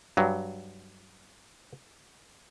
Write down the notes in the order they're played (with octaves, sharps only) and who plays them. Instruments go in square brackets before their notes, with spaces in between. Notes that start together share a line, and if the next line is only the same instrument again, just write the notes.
[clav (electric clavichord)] G2 F#3